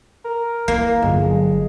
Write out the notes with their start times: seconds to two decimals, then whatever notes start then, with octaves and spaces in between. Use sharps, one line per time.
0.25 A#4
0.68 E3 A#3
1.02 G1 F#3 G#3